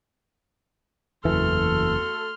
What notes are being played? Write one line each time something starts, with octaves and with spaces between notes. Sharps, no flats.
F#1 E2 E3 A3 F#4 A4 C6 F6